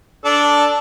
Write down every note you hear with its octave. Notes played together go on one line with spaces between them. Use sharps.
D4 A4